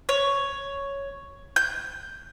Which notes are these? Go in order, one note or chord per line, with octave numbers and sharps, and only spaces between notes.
C#5
G6